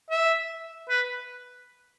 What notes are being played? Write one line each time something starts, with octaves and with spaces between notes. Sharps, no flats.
E5
B4